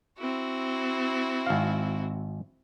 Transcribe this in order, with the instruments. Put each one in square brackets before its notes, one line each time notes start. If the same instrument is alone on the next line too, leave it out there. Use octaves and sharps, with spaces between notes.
[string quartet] C4 E4 F#4
[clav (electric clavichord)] G#1 F5